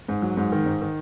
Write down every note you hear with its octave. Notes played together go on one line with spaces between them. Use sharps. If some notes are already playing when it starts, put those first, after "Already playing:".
G#2
F#3
G#2
D#3
G#2
D#3